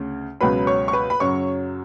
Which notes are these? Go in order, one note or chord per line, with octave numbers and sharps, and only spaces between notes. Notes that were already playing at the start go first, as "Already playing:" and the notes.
Already playing: D2 C#3
C#2 B2 F#3 B4 B5
C#5 C#6
C#6
B4 B5
B5
F#2 C#3 F#3 C#5 C#6